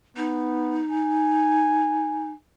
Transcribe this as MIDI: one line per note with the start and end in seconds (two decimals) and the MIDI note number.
0.17 0.83 59
0.17 2.32 63
0.91 2.35 80